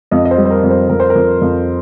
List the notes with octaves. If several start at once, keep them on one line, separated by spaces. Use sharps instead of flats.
F2 D#5
D#5
C5
G3
C5
A#4
F2
C5
F2 A#4
C5
A#4
F2
F2